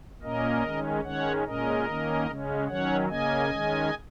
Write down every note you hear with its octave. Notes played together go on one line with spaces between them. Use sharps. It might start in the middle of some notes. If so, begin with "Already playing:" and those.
A#2 A#3 C#4 A#4 D#5
D#3 G#3 C#4
D#3 G#3 C#4 C#5 F#5
A#2 G#3 C#4 A#4 D#5
D#3 A#3 C#4
C#3 G#3 C#4
D#3 F#3 C#4 C#5 F#5
C#3 A#3 C#4 D#5 G#5
D#3 G#3 C#4